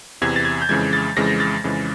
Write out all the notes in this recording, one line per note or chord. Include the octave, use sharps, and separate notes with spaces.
E2 C3 E3 G#6
A6
G#6
G6
F2 C#3 E3 G#3 G#6
A6
F2 C#3 E3 G#3 A#6
A6
F2 C#3 E3 G#3